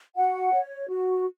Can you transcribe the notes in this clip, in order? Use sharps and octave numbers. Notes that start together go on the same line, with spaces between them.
F#4 F#5
C#5
F#4